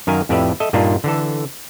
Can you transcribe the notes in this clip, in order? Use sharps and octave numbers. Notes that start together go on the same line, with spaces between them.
F#2 D#3 A#4 F5 G#5
F2 A2 G4 B4 D5 E5
A4 D#5 E5
G2 A#2 A#3 D4 D#4 F4
D3 E3 A4